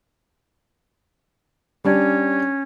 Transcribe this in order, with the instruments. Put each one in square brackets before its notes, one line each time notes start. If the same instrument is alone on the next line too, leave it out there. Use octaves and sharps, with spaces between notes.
[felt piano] G3 D4 D5 [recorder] C#4